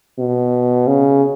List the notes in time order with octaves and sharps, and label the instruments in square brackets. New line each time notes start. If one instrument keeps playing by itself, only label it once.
[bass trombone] B2
C#3